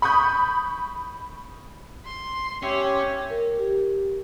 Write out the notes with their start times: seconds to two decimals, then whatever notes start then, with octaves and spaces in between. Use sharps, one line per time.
0.02 B5 C#6 D#6 G6
2.04 C6
2.63 C#4 G4 C#5 E5
3.30 A#4
3.59 G4